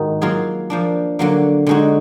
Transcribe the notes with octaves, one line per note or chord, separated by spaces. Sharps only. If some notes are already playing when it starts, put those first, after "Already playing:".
Already playing: G#2 D#3 D#4 F#4
F#3 A#3 F4 G#4
F3 A#3 D4
D3 F#3 A#3
D3 G#3 D#4 F#4